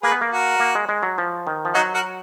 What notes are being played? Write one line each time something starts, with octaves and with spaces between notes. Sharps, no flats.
A#3 G#4 B4
B3
A#3
F#4 A#4
A#3
G#3
G#3
F#3
F3
D#3
F3
F#3 D#4 F#4
F#4 A#4